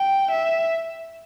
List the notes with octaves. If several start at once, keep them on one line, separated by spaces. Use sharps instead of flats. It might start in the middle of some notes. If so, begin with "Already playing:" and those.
Already playing: G5
E5